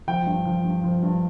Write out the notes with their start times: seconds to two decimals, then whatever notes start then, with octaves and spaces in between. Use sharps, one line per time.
0.08 F3 G5
0.26 G2
0.45 F3
0.64 G2
0.84 F3
1.03 G2